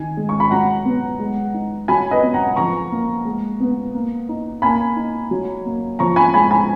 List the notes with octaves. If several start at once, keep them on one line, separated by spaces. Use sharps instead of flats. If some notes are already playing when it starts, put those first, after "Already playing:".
Already playing: D#3 G#5
G#3
C#6
B5
F#3 F#5 A#5
B3
G#3
D#4
F#3 G#5 B5
B4 D#5
B3
F#5 A#5
F3 A#5 C#6
A#3
G#3
B3
A#3
D#4
A#3 G#5 B5
D#4
F#3
A#3
F3 A#5 C#6
G#5 B5
G#3 G#5 B5
G#5 B5